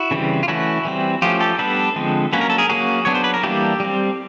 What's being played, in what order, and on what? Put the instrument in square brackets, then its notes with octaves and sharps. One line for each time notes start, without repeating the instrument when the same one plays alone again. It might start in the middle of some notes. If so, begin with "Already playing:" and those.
Already playing: [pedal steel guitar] E4 F#4
C#3 E3 G3 C4
F4
E3 A3 C#4 E4 F#4
E3 G3 C4
F3 A3 C#4 F4 G4
G4 A4
G3 B3 D4 A4 B4
D3 F3 G#3 C4
F#3 A#3 C#4 B4
A#4
A4
G#4 A#4
F#3 A#3 C#4 F#4 G#4
F#3 B3 D4 C#5
C5
B4
A#4
E3 G3 A#3 D4 G4 A4
G3 C4